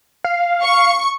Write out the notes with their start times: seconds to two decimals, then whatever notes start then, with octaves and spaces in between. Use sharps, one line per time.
0.24 F5
0.62 C#6